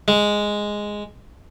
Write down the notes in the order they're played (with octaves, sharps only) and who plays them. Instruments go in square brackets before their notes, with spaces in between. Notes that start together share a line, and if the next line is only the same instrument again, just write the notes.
[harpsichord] G#3